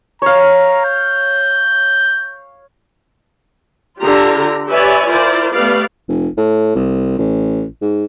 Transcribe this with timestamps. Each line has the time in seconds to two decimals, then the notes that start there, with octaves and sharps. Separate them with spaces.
0.22 C#5 F5 A#5
0.85 G6
4.00 D3 D4 F4 G4 A#5
4.69 G4 B4 C#5 D5 E5 G#5
5.09 E4 F4 A#4 C5 D5
5.54 A3 B3 G4 B4 D5 F5
6.08 F1
6.37 A2
6.75 C2
7.19 A1
7.81 G#2